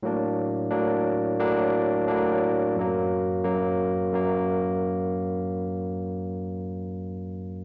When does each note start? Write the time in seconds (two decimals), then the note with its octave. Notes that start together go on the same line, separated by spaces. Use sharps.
0.03 A2 F#3 A#3 D4
0.70 A2 F#3 A#3 D4
1.40 A2 F#3 A#3 D4
2.08 A2 F#3 A#3 D4
2.76 F#2 F#3 A#3
3.44 F#2 F#3 A#3
4.13 F#2 F#3 A#3